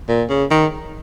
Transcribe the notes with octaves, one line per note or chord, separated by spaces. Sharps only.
A#2
C#3
D#3